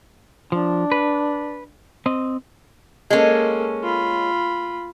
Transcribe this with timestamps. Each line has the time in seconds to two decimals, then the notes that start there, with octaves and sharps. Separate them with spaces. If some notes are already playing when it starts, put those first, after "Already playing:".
0.52 F3 D4
0.92 B4
2.06 C4 D#5
3.10 G#3 A#3 C#4 A4
3.83 F4 B5